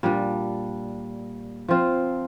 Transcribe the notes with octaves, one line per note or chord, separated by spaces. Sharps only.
A#2 G3 D4
F3 C4 F4